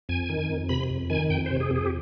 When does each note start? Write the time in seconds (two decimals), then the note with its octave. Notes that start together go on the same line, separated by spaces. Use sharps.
0.09 F2 G#5
0.30 D#3
0.50 F2
0.69 C3 B5
0.89 F2
1.10 D#3 G#5
1.30 F2 G5
1.46 C3 C5
1.60 G#4
1.70 F2
1.76 G#4
1.85 G4